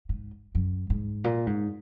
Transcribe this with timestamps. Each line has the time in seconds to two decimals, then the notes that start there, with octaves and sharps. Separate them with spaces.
0.09 G#2
0.55 F#2
0.90 G#2
1.24 A#2
1.47 G#2